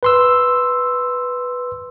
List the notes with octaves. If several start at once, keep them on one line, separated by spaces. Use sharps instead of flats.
B4 C6 E6